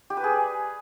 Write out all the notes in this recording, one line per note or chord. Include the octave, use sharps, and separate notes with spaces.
G4
B4
G#4